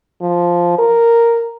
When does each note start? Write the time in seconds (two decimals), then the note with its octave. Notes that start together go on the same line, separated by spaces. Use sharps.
0.21 F3
0.78 A#4